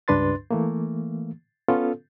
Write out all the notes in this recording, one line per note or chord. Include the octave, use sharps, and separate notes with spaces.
C#2 G2 D4 B4 C6 A6
E3 A3 A#3
B3 C#4 F4 A4